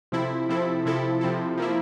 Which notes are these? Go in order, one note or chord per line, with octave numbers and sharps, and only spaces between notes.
C3 F3 C4 E4 A4
C3 F3 C4 E4 A4
C3 F3 C4 E4 A4
C3 F3 C4 E4 A4
F3 A#3 E4